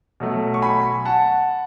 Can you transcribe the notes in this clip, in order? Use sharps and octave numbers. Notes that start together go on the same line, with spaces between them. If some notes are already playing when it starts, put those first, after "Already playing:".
B2 F#3 A3
C#6
G#5 B5
F#5 A5